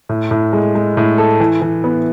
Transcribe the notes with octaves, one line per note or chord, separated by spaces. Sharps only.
A2
A2
G#3
G#3
A2
A4
E3
E3
B3